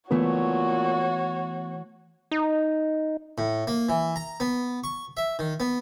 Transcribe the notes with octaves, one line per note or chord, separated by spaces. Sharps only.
A#2 E3 A3 B3 E4 F#4 C#5
D#4
A2
A#3
E3
A#5
B3
C#6
E5
D#3
B3